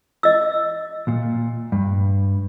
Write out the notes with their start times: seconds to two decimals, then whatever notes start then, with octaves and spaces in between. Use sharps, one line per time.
0.23 D#5 E6
1.08 A#2
1.72 G2